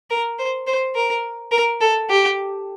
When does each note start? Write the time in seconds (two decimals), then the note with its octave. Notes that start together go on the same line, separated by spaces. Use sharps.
0.10 A#4
0.39 C5
0.67 C5
0.95 A#4
1.51 A#4
1.81 A4
2.09 G4